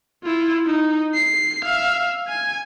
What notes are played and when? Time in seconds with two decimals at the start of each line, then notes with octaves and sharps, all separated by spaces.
0.24 E4 F4
0.66 D#4
1.14 C7
1.65 E5 F5
2.28 G#5